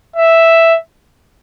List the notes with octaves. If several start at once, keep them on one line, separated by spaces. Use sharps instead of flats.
E5